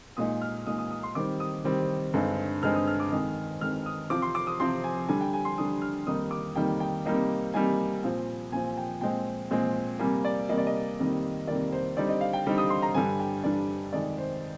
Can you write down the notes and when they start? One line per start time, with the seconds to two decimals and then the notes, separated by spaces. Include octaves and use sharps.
0.17 A#2 G#3 D#4 D#6
0.41 F6
0.66 A#2 G#3 D#4 D#6
0.79 D#6
0.91 D#6
1.03 C6
1.15 D#3 G3 C4 D6
1.40 D#6
1.64 D#3 G3 C4
2.14 G2 D3 G#3 C4 D#4
2.63 G2 D3 G#3 C4 D#4 F6
2.75 D#6
2.87 F6
3.00 D6
3.12 F2 D#3 G#3 D#6
3.61 F2 D#3 G#3 F6
3.86 D#6
4.10 C3 F3 C4 D6
4.22 C6
4.35 D6
4.47 D#6
4.60 C3 F3 C4 C6
4.84 G#5
5.09 D3 G3 D4 G#5
5.21 G5
5.33 G#5
5.45 C6
5.58 D3 G3 D4 D#6
5.82 F6
6.07 F2 D#3 G3 A#3 D#4 D#6
6.31 D6
6.56 F2 D#3 G3 A#3 D#4 G5
6.80 G5
7.05 C3 G3 A#3 D#4
7.54 C3 G3 A#3 D#4 G#5
8.04 A#2 F3 C4
8.52 A#2 F3 C4 G#5
8.77 G5
9.01 A#2 G#3 C4 G5
9.51 A#2 G#3 C4
10.00 C3 G3 A#3 G#5
10.25 D5
10.49 C3 G3 A#3 D#5
10.58 D5
10.67 D#5
10.98 F2 C3 D#3 G3 A#3
11.47 F2 C3 D#3 G3 A#3 D5
11.72 C5
11.96 D3 G3 C4 D#4 D5
12.09 D#5
12.21 F5
12.33 G5
12.46 D3 G3 C4 D#4
12.58 D#6
12.70 C6
12.82 A#5
12.94 G2 D3 G3 D4 G#5
13.20 G5
13.44 G2 D3 G3 D4 D5
13.93 F2 C3 D#3 G#3 D5
14.18 C5